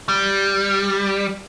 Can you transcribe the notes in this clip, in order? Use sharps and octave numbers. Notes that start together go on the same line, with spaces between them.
G3